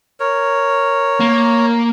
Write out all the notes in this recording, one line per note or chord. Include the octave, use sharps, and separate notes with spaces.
A#4 C#5
A#3